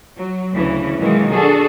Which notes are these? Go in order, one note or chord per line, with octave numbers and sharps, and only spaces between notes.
F#3
D2 C#3 E3 C#4
B2 D#3 E3 F#3 G#3 A#3
D4 F#4 G#4 A4